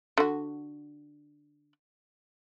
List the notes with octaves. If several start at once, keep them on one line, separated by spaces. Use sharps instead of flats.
D3 F#4